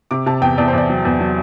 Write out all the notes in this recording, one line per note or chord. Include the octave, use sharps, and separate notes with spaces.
C3 D6
C3 A5
E2 G5
E2 D5
C5
E2 D5
F#3
E2
F#3